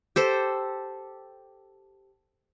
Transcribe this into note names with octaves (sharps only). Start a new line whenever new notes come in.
G4 A4 C5